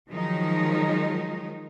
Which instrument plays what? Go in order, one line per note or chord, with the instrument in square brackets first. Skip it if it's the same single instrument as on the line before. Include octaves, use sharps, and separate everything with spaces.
[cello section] D#3 F3 F#3 G#3 D#4